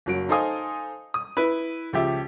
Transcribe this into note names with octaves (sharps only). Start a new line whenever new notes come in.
F#1 F#3 D7
D#4 A4 C5 F5 G#5 D#6
D#6
E4 B4
C#2 F3 G4 E5